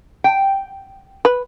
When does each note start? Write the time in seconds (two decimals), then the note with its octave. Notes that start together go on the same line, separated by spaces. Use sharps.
0.24 G5
1.25 B4